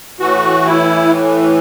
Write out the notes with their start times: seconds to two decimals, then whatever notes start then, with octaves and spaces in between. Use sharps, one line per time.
0.20 A2 E3 F#4
0.64 E4